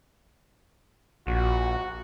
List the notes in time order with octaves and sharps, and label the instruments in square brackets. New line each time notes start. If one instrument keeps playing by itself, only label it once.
[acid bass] A#1 [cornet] F#4